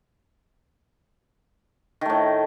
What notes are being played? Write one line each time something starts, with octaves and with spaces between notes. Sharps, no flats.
A2 D#3 A3